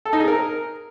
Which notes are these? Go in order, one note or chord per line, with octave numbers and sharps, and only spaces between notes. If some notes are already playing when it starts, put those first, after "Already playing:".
A4
D#4
G#4
A#4